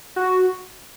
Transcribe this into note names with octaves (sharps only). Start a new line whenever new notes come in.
F#4